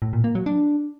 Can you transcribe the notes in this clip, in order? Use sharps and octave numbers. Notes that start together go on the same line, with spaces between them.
A2
A#2
A#3
F#3
D4